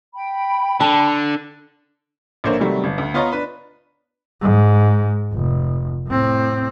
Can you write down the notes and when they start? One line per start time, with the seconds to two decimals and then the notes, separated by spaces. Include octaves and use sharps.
0.15 G5 B5
0.81 D3 A5
2.44 A#1 D3 A#3 C5 C#5
2.60 C3 D#3 F#3 G3 A3
2.84 G1
2.98 D2
3.14 B3 F4 C#5 D#5 A#5
3.32 D4 B4 B5
4.42 G#2
5.33 F1
6.07 A2 C4